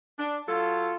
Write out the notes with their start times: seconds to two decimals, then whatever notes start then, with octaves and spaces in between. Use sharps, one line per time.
0.19 D4
0.49 F#3 F4 A4